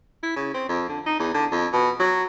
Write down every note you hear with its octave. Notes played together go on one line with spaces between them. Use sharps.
E4
C#3
C4
F2
D3
D#4
E2
D3
F2
B2
F#3